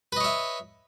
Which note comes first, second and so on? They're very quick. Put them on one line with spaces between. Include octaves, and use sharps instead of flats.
B4 D#5 C#5 E5